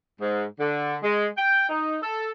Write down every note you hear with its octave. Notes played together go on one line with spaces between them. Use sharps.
G#2
D3
G#3
G5
D#4
A4